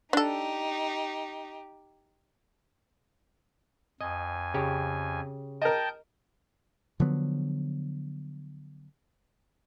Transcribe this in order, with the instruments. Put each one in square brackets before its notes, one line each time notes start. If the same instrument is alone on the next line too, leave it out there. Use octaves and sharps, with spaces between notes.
[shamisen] D4 A4 [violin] D#4 G4
[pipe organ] F2 G#5 [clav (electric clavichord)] D#5
[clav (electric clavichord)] C#3 G4 C#5
[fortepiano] A#4 D#5 [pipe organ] G5 A5 G6
[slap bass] D3 F3 F#3 B3